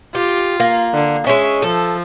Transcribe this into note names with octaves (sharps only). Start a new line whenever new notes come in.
F4 G4
A#3
D3
G#3 C#4 E5
F3 A4